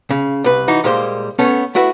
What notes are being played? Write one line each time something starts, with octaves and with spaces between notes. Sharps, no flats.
C#3
C2 B4
E3 D#4 F#4
A#2 G3 G#3 A#3 C5
A3 B3 C#4 A4 C#5
A3 E4 F#4 B4 E5